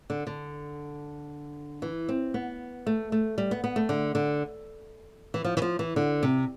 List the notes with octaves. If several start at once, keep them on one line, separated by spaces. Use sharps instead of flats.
D3
D3
E3
C4
B3
A3
A3
G3
B3
B3
A3
D3
D3
E3
F3
E3
F3
E3
D3
C3